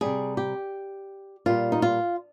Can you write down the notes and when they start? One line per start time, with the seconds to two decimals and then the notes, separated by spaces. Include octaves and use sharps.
0.01 C3 G3 G#4
0.37 G4
1.46 A#2 G3 F4
1.72 D#4
1.82 F4